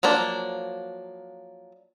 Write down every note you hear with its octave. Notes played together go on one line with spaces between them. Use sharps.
F3 F#3 A#3 D4